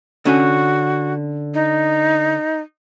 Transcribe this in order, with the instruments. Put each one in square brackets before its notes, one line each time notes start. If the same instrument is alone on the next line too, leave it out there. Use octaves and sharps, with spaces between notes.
[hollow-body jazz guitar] D3 C#4 G#5 [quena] F#4
[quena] D#4